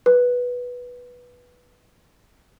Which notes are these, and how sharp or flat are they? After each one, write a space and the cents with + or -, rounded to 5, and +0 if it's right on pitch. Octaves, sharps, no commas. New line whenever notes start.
B4 -10